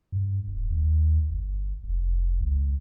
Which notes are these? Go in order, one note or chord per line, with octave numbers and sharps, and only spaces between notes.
G2
D#1
D#2
G1
F1
C#2